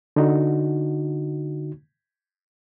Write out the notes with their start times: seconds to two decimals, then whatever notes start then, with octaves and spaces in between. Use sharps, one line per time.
0.16 D3 D#4 F#4